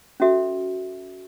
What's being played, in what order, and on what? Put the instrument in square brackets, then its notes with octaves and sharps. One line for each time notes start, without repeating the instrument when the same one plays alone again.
[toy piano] C#4 F#4 A4 E5